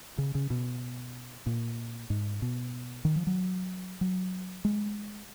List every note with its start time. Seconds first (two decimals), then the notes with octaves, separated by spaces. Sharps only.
0.18 C#3
0.35 C#3
0.50 B2
1.46 A#2
2.10 G#2
2.42 B2
3.05 D#3
3.16 F3
3.27 F#3
4.01 F#3
4.65 G#3